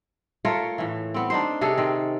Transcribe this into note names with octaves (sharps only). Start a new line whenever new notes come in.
A3 F4 A#4 C#5
A2 E3
B3 C4
D4 D#4 C5
C3 C#4 G#4 A4
D#3 C4